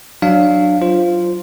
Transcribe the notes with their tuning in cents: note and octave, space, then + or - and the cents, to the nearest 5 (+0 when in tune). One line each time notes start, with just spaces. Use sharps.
F#3 +0 D4 +20 F5 +0
F4 -5 C5 +0